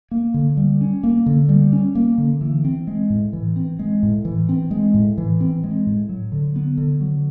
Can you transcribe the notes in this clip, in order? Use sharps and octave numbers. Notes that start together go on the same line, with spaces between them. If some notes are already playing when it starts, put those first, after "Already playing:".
A#3
D3
G3
C#4
A#3
D3
G3
C#4
A#3
D3
E3
C4
G#3
A2
E3
C4
G#3
A2
E3
C4
G#3
A2
E3
C4
G#3
A2
F#3
D3
B3
D3
F#3